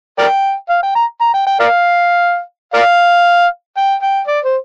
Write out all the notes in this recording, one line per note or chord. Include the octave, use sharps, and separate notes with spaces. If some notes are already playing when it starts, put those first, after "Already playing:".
A#4 D5 G5
F5
G5
A#5
A#5
G5
G5
A#4 D5 F5
A#4 D5 F5
G5
G5
D5
C5